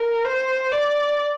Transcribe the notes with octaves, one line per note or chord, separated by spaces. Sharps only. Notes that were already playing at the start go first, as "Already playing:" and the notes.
Already playing: A#4
C5
D5